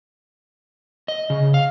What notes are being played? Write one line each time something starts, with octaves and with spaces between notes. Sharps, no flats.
D#5
C#3
F5